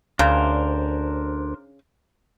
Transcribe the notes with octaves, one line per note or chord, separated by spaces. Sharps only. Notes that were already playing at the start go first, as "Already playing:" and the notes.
D2 C#3 D4 A#4 C5